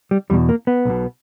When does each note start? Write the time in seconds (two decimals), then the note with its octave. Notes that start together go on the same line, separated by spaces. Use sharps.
0.11 G3
0.30 E2 B2 G3
0.49 A#3
0.67 B3
0.85 B1 B2